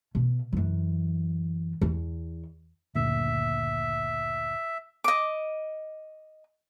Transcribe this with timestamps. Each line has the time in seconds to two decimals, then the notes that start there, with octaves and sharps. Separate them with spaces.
0.15 B2
0.53 F#2 E3
1.81 E2
2.95 F#1 D2 A#2 E5
5.04 D#5 D6